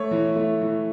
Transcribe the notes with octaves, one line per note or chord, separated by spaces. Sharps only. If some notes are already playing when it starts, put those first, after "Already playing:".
Already playing: A3 C#5
E3
A3
E3